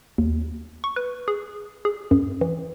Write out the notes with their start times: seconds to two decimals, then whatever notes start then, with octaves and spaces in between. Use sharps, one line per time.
0.18 D#2
0.84 C#6
0.96 B4
1.28 G#4
1.85 G#4
2.11 F#2
2.41 E3